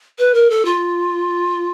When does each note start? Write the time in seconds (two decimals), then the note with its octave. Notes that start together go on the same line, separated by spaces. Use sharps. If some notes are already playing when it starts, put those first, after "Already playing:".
0.19 B4
0.34 A#4
0.50 A4
0.65 F4